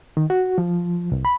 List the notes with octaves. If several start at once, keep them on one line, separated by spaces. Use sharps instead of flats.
D#3
F#4
F3
C2
B5